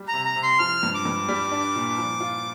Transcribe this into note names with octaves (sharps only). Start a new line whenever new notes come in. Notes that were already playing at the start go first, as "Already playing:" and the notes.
Already playing: G3
A#5
C3
A#5
C3
C6
F3 F6
G2
D6
G2
G3
D4
A#2
F3
F4